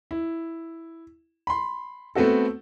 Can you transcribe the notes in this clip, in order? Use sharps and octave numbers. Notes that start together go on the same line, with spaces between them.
E4
B5 C6
A3 B3 C4 F#4 A4